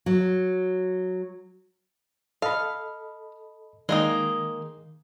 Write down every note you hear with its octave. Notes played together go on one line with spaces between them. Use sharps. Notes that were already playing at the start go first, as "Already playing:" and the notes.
F#3
A4 D#5 F5 B5
D#3 G#3 A#3 D#4